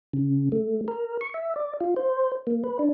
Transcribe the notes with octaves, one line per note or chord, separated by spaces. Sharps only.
C#3
A3
A#4
C#6
E5
D5
F4
C5
A#3
B4
D4